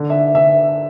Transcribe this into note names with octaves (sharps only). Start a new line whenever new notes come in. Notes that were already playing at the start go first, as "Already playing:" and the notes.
Already playing: D3
E5
D3 E5